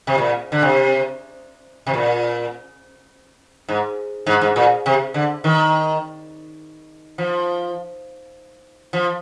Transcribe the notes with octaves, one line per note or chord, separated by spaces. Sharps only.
C3
A#2
D3
C3
C3
A#2
G#2
G#2
G#2
A#2
C3
D3
D#3
F3
F3